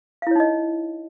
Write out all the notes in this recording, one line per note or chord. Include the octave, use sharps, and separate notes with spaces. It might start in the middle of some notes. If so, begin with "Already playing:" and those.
D#4 E4 C#5 D#5 F5